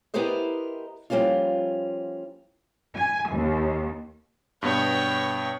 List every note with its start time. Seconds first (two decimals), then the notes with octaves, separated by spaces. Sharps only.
0.14 B3 E4 G4 A#4 C5 D#5
1.10 F3 G3 A#3 C#4 F4
2.97 G#5
3.32 D#2
4.63 G2 B2 B3 C#5 G5